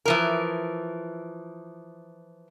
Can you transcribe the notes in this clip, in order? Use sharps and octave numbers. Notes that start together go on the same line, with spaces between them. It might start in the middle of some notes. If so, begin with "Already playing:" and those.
E3 F3 A#4